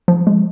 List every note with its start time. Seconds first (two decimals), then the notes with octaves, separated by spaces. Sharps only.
0.08 F3
0.27 G#3